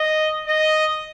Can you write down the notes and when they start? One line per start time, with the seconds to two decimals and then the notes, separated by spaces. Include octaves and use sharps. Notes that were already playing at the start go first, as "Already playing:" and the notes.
Already playing: D#5
0.47 D#5